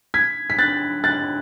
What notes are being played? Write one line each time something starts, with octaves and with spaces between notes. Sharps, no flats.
G#6 B6
B6
F#6 A6
F#6 A6